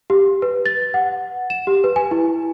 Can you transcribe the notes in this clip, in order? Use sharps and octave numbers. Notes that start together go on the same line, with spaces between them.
G4
B4
A6
F#5
E7
G4
B4
G#5
E4